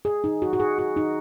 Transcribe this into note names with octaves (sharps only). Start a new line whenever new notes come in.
G#4
D#4
F#4
F#4
G#4
F#4
D#4